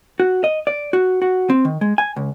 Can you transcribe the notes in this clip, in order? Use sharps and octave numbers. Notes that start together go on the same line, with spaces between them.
F#4
D#5
D5
F#4
F#4
C4
D#3
G#3
G#5
C#2